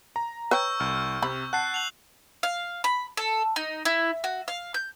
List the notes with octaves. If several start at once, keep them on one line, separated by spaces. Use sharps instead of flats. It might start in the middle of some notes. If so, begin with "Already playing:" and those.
A#5
B4 C#5 G5 C#6 E6 G6
C2 F6
C3 C4 B5
F#5 A5 F#6 C7
F7 F#7
F5
B5
A4
D#4
E4
F#4
F5
G6